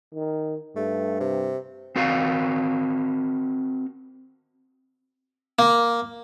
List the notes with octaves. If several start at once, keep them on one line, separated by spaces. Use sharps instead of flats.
D#3
G2 A3
C3
C4 F#4 A#4 F5
A#3